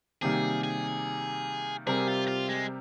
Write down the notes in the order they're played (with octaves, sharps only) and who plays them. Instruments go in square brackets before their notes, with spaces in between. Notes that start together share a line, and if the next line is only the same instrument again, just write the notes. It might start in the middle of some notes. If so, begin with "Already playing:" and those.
[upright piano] C3 D#3 G3 A#3 [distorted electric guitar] G#4
[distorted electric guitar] G#4
[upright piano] C3 G3 C4 G4 A#4 [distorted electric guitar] G#4
[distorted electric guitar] F4
F4
G#3